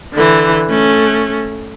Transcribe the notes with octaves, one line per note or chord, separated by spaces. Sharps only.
D3 E3
A3 C#4